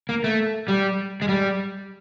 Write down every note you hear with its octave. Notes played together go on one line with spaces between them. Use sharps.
A#3
A3
G3
G#3
G3